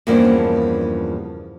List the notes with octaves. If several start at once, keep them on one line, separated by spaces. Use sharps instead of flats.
E2 G2 C#3 F3 A#3 D4